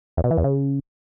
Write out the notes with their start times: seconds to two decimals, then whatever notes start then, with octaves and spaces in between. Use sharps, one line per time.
0.17 E2
0.24 B2
0.31 E3
0.38 E2
0.44 C#3